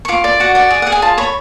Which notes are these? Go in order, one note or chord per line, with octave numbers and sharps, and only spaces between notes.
C#6
F4 D6
D5
F#4 F#5
D5 F#5
G#4
G#4 F#5
G#5
F4 A5
C#5 B5